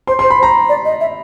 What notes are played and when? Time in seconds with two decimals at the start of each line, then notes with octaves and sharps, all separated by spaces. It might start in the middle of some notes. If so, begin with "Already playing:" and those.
0.07 C5 C6
0.19 C5 C6
0.30 B5
0.39 C5
0.43 A#5
0.69 D5
0.85 D#5
1.00 E5